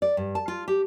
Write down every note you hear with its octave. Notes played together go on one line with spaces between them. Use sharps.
D5
G2
A5
F4
G4